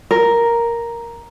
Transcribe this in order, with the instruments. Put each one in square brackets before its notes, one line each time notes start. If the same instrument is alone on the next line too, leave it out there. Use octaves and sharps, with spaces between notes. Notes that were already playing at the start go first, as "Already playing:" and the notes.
[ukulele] A#4